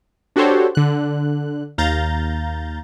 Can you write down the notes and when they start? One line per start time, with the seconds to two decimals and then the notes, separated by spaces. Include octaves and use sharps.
0.36 D4 F#4 G4 A4 C5 C#5
0.75 D3 F#6
1.78 D#2 F5 A#5 G6 A6